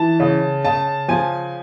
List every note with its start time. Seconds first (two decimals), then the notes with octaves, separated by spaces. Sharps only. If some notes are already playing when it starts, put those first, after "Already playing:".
Already playing: E3 A5
0.20 C#3
0.65 C#3 A5
1.08 F3 G#5